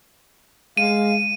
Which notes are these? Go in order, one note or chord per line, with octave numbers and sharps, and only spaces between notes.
G#3 F5 D#7